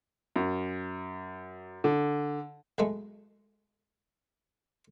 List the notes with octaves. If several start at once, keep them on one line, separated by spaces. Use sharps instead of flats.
F#2
D3
B1 G#3 A3